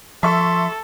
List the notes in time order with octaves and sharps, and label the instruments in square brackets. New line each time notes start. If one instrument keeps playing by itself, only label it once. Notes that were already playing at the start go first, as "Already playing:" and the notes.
[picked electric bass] F3 [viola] A4 [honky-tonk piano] E5 C#6 [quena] C6